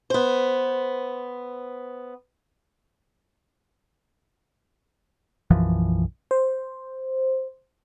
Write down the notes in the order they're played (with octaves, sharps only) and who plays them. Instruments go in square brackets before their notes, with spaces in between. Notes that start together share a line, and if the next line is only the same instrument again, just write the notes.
[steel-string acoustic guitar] B3 C5
[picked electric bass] B1 F#2 E3 F3
[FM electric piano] C5